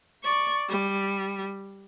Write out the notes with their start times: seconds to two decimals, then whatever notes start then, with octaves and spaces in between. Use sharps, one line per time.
0.23 D5 C#6
0.69 G3